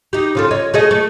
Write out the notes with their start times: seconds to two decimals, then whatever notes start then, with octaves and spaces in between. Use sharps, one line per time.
0.13 D#4 G4
0.35 C#3 F4 A4
0.51 C#5 D#5
0.74 A3 G#4 D#5
0.91 A3